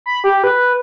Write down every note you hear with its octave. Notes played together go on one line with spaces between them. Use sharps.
B5
G4
B4